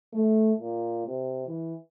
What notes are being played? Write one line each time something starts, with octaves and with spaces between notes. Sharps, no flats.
A3
A#2
C3
E3